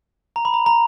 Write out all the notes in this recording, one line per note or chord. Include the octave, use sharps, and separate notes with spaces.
A#5
B5
A#5
A#5